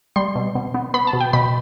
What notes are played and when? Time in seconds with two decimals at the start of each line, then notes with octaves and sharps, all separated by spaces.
0.16 G3 C6
0.35 B2
0.55 B2
0.74 B3
0.94 B3 B5
1.07 A5
1.13 B2
1.21 G5
1.33 B2 B5